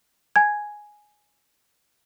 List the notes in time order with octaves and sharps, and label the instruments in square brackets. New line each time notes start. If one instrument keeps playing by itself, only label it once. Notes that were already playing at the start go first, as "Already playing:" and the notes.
[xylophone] G#5 G#6